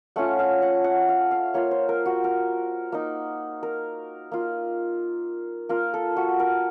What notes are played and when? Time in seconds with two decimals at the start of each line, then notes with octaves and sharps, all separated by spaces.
0.16 A3 C#4 F4 F#5
0.39 F5
0.62 F#5
0.84 F#5
1.09 F5
1.31 F5
1.54 A#3 F4 C#5
1.71 C5
1.89 A#4
2.06 F#4
2.24 A#4
2.92 A#3 D#4
3.63 A#4
4.32 A#3 F4
5.69 A#3 F4 A#4
5.94 A4
6.16 F#4
6.40 A#4